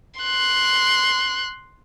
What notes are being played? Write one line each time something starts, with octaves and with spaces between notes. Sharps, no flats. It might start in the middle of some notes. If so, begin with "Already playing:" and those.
C6 F#6